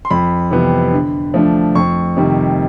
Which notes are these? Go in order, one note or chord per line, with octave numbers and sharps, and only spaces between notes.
C6
F2 B5
C3 E3 G3 B3
D3
F3 A3 D4
F2 C#6
C3 D#3 G3